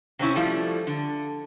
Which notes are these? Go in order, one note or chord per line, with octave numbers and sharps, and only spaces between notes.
C3 C4 C#4 E4
F3 G3 A3 E4
D3